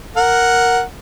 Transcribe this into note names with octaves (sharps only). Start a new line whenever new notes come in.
A#4 F#5